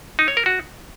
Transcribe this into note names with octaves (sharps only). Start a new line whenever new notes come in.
D#4
C#5
A#4
F#4